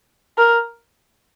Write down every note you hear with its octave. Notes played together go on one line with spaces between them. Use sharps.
A#4